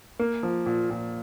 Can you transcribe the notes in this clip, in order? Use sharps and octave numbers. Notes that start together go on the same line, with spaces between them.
A#3
F3
A#2
A#2